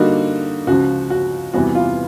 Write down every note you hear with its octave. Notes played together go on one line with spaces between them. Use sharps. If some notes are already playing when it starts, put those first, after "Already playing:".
Already playing: D3 G3 A#3 D#4 F#4
C#2 C#3 F3 F#4
F#4
E2 C3 E3 G3 B3 F#4
F4